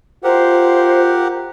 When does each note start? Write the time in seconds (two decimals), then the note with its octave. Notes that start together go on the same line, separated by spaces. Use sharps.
0.24 F4 G4 A#4 C5 F#5